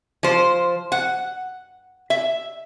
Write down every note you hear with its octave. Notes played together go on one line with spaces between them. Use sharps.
F3 C5
F#5
E5